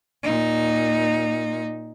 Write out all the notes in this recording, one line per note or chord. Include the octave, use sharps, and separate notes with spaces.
A#2 D#4